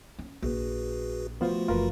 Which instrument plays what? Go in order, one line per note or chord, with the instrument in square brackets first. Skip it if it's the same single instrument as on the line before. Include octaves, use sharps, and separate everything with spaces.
[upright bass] C#4
[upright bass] A#1 [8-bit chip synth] F#4 G#4 B4
[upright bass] D#3 [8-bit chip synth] F3 A3 F#4 [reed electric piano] B3 F4 C5
[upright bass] F#1 E3 [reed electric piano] F4 A#4 B4